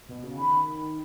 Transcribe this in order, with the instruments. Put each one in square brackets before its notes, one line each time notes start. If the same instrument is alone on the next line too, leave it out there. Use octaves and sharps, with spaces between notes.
[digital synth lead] B2
C#3
[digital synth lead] D#3 [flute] B5